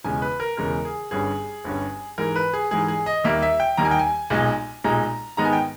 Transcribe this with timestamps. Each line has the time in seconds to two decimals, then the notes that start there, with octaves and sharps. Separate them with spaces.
0.04 E1 E2 C#3 G#3 G#5
0.22 B4
0.40 A#4
0.57 E1 E2 C#3 G#3 A#4
0.85 G#4
1.11 G1 G2 G3 C#4 G#4
1.64 G1 G2 G3 C#4
2.18 G#2 E3 G#3 A#4
2.36 B4
2.53 G#4
2.71 G#2 E3 G#3 G#4
2.88 G#4
3.06 D#5
3.24 D#2 D#3 G3 A#3 D#4 E5
3.42 E5
3.60 G5
3.77 D#2 D#3 G3 A#3 D#4 A#5
3.85 G#5
3.91 G5
3.99 G#5
4.30 B1 A#2 G#3 D#4
4.84 B1 A#2 G#3 D#4 A#5
5.37 G#2 D#3 G#3 B3 D#4 A#5
5.45 G#5
5.53 G5